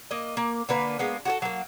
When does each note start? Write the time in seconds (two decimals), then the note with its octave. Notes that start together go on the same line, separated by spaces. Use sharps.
0.11 A#3 D#5
0.37 A#3
0.69 D3 A#3 B4
0.99 G#3 A#3 B3
1.25 F#4 G#4 A4
1.42 F#3 A#3